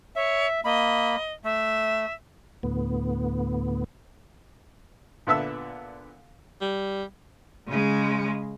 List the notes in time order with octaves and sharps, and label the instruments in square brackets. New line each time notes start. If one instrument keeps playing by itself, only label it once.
[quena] C#5 [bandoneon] E5
[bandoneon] A#3 B5 [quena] D#5
[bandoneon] A3 [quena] E5
[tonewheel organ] D2 A2 B3
[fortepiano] A#2 D3 B3 E5 A5 E6
[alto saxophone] G3
[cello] C#3 G#3